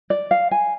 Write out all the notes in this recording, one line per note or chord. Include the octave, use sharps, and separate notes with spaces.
D5
F5
G#5